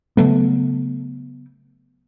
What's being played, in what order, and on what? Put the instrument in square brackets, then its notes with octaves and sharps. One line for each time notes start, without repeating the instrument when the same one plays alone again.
[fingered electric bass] C#3 F#3 A3 B3